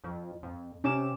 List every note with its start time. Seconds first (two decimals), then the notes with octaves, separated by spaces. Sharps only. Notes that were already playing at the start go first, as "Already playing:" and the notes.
0.04 F2
0.43 F2
0.84 C3 C#4 D6 E7